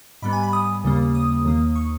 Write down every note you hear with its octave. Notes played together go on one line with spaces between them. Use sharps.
G#2 G3 B3 B5
G#5
B5
D#6
D#2 C#3 G3 A#3
D#6
D#2 D#3 A#3
C#6